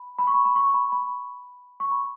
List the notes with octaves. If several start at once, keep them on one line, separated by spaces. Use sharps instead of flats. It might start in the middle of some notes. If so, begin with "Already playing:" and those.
Already playing: B5
B5
C#6
B5
B5
C#6
B5
B5
C#6
B5